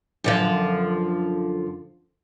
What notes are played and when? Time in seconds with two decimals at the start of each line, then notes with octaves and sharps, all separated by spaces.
0.24 F#2 D3 F3